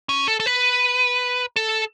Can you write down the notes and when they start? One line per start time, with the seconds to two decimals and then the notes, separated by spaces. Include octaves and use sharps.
0.09 C#4
0.28 A4
0.40 A4
0.46 B4
1.56 A4